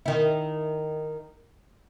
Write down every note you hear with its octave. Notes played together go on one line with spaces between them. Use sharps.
D#3 E4